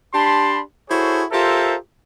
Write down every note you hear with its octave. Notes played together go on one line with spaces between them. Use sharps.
D4 G4 A5 B5 C6
E4 F#4 G#4 A4 C5 C#5
F4 G4 A4 A#4 C5 E5